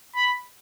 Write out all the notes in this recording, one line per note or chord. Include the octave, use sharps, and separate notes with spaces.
B5